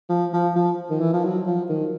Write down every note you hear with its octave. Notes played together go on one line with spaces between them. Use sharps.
F3
F3
F3
D#3
E3
F3
F#3
F3
D#3